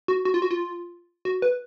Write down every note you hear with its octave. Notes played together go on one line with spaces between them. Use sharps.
F#4
F#4
F4
F#4
F4
F#4
B4